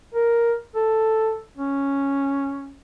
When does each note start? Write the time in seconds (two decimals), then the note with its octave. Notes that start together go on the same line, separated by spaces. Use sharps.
0.15 A#4
0.75 A4
1.57 C#4